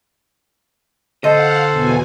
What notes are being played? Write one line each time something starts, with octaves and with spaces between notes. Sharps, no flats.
D3 A4 C5 D#5 F5 F#5
E2 B2 G#5